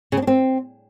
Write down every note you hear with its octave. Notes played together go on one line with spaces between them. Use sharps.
C#3
C4
D4
C4